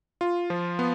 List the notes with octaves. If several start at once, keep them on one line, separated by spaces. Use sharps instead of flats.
F4
F3
B3